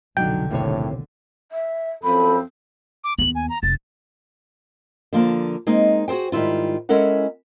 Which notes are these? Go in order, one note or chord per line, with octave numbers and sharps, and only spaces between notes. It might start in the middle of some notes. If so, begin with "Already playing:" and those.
F1 B1 D3 F#3 D4 D#4 G5
D#2 A2 C3 C#5
E5
F#2 F3 C4 A4 B5
D6
D#2 B3 F#7
G#5
A#5
F1 A6
D3 F3 A#3
G#3 A#3 C4 D#4
F#4 G#4 A4 C5 G5
G#2 D#3 G3 E4 F4
G#3 C#4 E4 A4 A#4 F#5